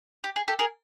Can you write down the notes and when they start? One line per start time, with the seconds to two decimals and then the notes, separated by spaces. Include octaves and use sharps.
0.24 G4
0.36 G#4
0.48 G4 A4
0.59 G#4 A#4